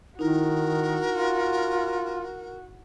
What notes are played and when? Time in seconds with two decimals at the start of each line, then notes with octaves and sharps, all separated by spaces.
0.19 D#3 D#4 E4 F#4 A#4
1.11 F4